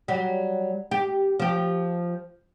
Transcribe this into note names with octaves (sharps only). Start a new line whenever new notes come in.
F#3 G3
G4
F3 G4